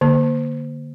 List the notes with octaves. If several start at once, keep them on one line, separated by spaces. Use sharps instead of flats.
D3 A#3